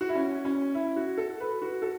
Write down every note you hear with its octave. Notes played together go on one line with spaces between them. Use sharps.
F#4
E4
C#4
C#4
E4
F#4
A4
B4
F#4
A4